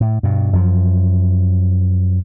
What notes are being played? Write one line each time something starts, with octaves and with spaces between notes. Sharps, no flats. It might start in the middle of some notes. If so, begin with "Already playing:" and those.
A2
G2 B2
F#2 F3